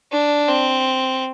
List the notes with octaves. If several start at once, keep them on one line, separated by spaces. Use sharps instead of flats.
D4
C4